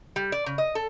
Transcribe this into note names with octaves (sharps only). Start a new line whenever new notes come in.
G3
D5
C#3
D#5
A4